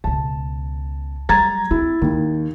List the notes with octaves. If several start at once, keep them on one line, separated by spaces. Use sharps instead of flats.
C#2 B2 A5
F#3 G3 A#5 G#6 A6
C4 E4
D#2 D#4